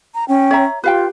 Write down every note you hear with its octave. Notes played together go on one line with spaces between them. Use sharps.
A#5
C#4 G5
C#5 E5 A#5
F4 G4 B4 F5 G5